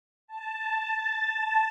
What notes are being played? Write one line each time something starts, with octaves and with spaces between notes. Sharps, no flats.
A5